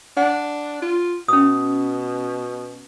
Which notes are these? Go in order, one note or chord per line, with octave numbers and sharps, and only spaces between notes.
D4 F#5
F4
B2 C#4 D#6